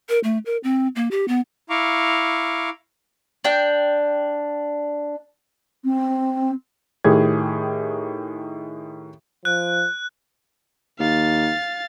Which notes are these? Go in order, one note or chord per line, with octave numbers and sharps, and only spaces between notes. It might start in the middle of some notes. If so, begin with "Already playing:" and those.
A#4
A3
A#4
C4
A#3
G4
B3
E4 F5 A#5 C#6 D6
D4 G5
C4
A2 D#3 G4 G#4 G#6
F3 F#6
D#2 F5 A6